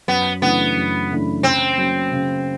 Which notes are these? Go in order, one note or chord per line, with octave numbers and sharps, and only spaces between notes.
F#2 B3
C#3 E3 A3 B3 D4
F#2
C#3 E3 A3 D4
C#3 C4
F#3 A#3 C#4
C#3